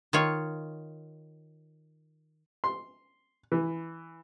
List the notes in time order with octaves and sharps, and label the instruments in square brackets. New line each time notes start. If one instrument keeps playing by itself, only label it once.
[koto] D#3 F4 C#5
[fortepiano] C6
E3